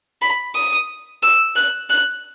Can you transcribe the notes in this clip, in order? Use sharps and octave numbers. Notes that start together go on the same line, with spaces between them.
B5
D#6
E6
F#6
F#6